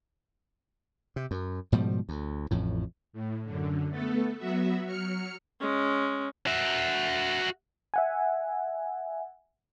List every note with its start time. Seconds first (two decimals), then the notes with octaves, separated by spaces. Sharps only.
1.16 C3
1.31 F#2
1.72 G#2 B2 F3 G3
2.09 D2
2.51 A1 F2 A2
3.13 A2
3.44 F#2 D3
3.91 A3 B3 A4
4.38 F#3 B3 F#4 E5
4.86 F#3 F6 C#7
5.60 G#3 C#4
6.47 F#4 E5
7.94 E5 F#5 G#5